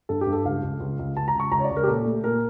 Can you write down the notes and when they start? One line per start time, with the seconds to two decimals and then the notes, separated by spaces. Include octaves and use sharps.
0.09 G2 A4
0.21 G4
0.27 G2
0.33 A4
0.45 C#2 F5
0.63 C#2
0.80 C#2
0.99 C#2
1.16 C#2 A5
1.28 A#5
1.35 C#2 C#6
1.52 C#2 A#5
1.59 C#5
1.64 D5
1.71 C#2
1.77 A#4
1.83 G4
1.87 A#2 A4
2.06 A3
2.24 A#2 A#4